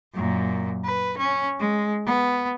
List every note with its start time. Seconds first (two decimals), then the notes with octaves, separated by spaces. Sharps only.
0.14 F#2 A#2
0.84 B4
1.18 C#4
1.59 G#3
2.06 B3